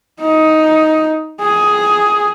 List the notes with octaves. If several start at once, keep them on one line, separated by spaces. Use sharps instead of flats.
D#4
G#4